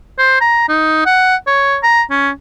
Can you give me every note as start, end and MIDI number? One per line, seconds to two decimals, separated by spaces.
0.19 0.37 72
0.41 0.67 82
0.69 1.05 63
1.06 1.36 78
1.47 1.77 73
1.83 2.02 82
2.10 2.30 61